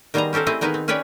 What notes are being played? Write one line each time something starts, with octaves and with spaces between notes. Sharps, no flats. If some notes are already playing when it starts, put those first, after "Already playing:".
D#3 G3 B3 G#4 C5 A#5
C#4 G4 A4 A#4 C5
A3 C4 E4 G#4 D#5
D#3 B3 D#4 G#4 A#4 B4
C4
C#4 G#4 B4 C#5 D5 G5